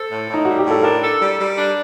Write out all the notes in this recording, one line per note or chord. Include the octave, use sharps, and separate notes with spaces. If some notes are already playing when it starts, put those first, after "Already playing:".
Already playing: A4 C5
A2
A2 D#4
G3 F#4
G4
A2
A4
D4 A#4
A4
G3
G3
D4